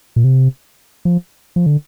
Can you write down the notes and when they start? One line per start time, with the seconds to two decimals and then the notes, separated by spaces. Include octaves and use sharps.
0.16 A#2
0.24 C3
1.05 F3
1.56 F3
1.66 D3